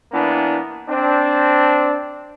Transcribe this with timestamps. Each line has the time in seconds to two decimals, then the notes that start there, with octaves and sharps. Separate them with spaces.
0.12 E3 A#3 B3 D4
0.88 C4 D4